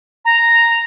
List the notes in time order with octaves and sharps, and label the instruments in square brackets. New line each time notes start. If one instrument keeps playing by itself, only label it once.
[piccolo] A#5